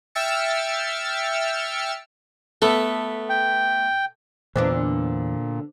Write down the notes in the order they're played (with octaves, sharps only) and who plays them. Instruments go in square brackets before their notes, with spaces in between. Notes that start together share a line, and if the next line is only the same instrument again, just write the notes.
[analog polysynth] E5 G5 E6 F6 A6 C#7
[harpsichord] A3 B3 [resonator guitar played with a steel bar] A4
[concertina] G5
[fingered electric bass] E2 [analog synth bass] A#2 [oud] D3 B3 D4 [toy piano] C5 D#5 D6